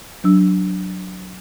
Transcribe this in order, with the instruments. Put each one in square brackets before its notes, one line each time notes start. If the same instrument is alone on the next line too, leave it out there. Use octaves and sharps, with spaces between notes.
[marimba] F#3 D4 E6